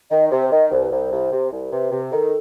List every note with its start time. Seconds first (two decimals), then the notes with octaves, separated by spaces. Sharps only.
0.11 D#3 D#5
0.31 C3 C5
0.52 D#3 D#5
0.71 C2 C5
0.82 B4
0.91 C2 C5
1.12 C2
1.32 C3
1.51 C2
1.72 C3 B4
1.92 C3
2.12 D#3 A4